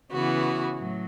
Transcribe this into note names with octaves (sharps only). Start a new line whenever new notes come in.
C#3 E3 B3 F#4
A2 F#3